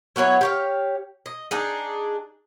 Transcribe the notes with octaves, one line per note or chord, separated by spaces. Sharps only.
F#3 B3 E4 C#5
G4 C#5 F5
D#5
D4 D#4 G#4